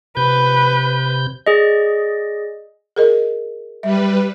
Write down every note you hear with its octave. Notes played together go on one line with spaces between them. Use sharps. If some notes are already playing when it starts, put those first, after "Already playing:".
C3 B4 G6
G#4 D5 D#5
G#4 A#4 D#5
G3 B4 E5